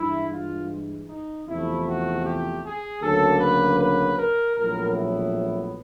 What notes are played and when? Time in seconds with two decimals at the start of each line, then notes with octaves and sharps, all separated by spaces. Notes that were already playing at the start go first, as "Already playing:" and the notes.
Already playing: G2 E3 G#3 E4
0.32 F4
1.09 D#4
1.47 E2 C3 F3 A3 E4
1.86 F#4
2.25 G4
2.64 G#4
3.01 D2 C#3 F#3 A#3 A4
3.40 B4
3.79 B4
4.17 A#4
4.56 A#1 A2 F#3 B3 A#4
4.94 E4